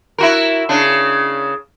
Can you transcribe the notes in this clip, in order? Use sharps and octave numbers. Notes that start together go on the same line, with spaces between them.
E4 F#4 A#4
C#3 D4